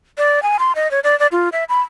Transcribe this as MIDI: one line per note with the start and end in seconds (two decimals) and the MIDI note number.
0.18 0.42 74
0.43 0.57 80
0.59 0.72 84
0.75 0.90 75
0.91 1.00 73
1.04 1.18 74
1.20 1.27 74
1.32 1.49 65
1.52 1.64 76
1.69 1.81 83